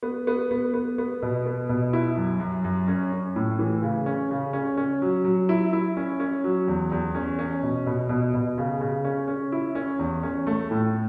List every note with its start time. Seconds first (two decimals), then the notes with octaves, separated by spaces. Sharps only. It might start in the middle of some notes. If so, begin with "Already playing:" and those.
0.03 B3
0.27 B3
0.51 B3
0.74 B3
0.98 B3
1.22 B2
1.46 B3
1.69 B2
1.93 E4
2.17 F#2
2.40 F#2
2.64 F#2
2.88 C#4
3.12 C#4
3.36 A2
3.59 E3
3.82 C#3
4.06 C#4
4.31 C#3
4.53 C#4
4.77 C#4
5.02 F#3
5.25 F#3
5.49 E4
5.73 E4
5.97 C#4
6.20 C#4
6.44 F#3
6.68 E2
6.92 E2
7.15 C#4
7.39 C#4
7.63 B2
7.86 B2
8.09 B2
8.34 B2
8.58 C#3
8.81 C#3
9.05 C#4
9.28 C#4
9.52 E4
9.75 C#4
9.99 E2
10.23 C#4
10.47 A3
10.71 A2